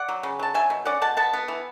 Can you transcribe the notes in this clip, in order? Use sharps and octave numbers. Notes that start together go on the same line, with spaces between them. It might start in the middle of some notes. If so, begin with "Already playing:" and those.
Already playing: D5 F#5
F#3
C#3
F#3 A5
F#3 E5 G#5
B2
C#4 D5 F#5
B2 F#5 A5
B3 F#5 A5
B3
E3